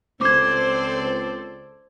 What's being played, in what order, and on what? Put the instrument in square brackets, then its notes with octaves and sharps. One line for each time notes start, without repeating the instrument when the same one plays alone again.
[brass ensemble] C#2 C4 D5 [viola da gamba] A4 C5 [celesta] D6 G#6